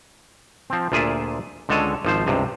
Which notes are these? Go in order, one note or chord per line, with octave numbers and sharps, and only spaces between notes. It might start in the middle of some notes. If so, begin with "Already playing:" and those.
F3 C4
D2 A#2 F4 G#4 D5 E5
C#2 D3 G#3 A4 C#5 G#5
G#1 F3 C5
C#2 G2 C3